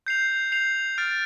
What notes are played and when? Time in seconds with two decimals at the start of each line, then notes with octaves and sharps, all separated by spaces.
0.07 G6 C7 F7
0.52 G6 C7 F7
0.98 F6 A6 D7